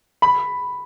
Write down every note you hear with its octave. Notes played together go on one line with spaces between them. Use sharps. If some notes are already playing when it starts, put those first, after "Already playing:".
B5